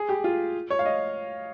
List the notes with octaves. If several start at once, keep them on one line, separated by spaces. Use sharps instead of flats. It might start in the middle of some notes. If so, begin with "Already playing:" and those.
Already playing: G#4
G4
F4
C#5
F5
D#5